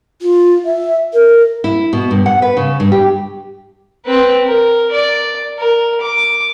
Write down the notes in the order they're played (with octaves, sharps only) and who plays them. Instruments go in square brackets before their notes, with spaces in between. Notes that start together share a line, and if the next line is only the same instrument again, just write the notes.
[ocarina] F4
E5
A#4
[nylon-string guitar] E4
B2
G2
F#5
B4
C#3
G2
G4
[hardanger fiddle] C4 B4
A#4
D5
A#4
D6